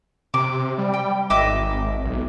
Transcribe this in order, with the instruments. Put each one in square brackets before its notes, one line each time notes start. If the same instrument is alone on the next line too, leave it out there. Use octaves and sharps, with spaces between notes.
[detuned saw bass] C3 [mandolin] D6
[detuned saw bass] G3
[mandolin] G5
[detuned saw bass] G#1 [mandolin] D#5 E5 D6
[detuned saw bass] B1